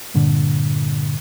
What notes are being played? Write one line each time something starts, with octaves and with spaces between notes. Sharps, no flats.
G2 A#2 D3